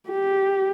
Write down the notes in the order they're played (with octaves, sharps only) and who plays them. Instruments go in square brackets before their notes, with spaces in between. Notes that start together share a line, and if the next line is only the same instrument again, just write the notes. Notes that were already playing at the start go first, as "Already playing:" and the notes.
[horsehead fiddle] G4